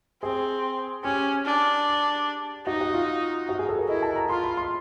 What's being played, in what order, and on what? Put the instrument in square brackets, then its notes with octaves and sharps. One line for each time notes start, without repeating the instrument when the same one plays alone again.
[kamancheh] C4 [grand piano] G#4
[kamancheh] C#4 [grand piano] G4
[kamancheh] D4
[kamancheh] D#4 [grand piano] F#4
[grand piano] F#4
F4
F#4
G#4
A4
A#4
[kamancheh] E4 [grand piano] D#5
[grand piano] A5
A#5
[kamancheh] F4 [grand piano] C6
[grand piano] B5
C6